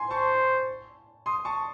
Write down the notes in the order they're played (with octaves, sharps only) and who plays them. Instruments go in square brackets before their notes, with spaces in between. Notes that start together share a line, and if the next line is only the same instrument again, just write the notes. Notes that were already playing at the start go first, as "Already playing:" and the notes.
Already playing: [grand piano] G#5 C6
[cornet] C5 [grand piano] A5 C#6
[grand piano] C6 D#6
A5 C#6